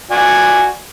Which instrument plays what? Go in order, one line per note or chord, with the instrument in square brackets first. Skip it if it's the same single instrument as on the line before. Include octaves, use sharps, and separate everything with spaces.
[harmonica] F#4 D5 G#5